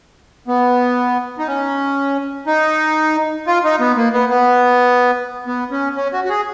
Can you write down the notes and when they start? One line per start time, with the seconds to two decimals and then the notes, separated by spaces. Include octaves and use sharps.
0.48 B3
1.39 D#4
1.47 C#4
2.47 D#4
3.47 F4
3.64 D#4
3.80 B3
3.97 A#3
4.13 B3
4.30 B3
5.47 B3
5.71 C#4
5.96 C#4
6.13 F#4
6.24 F#4
6.29 G#4